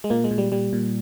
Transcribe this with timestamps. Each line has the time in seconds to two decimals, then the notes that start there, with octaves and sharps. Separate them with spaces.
0.04 G#3
0.10 A#2 A#3
0.24 G#3
0.31 A#2
0.38 G3
0.52 A#2 G3
0.73 A#2